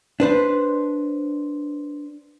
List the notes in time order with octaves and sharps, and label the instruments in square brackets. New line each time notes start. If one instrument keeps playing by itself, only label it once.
[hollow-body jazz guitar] D4 B4 C5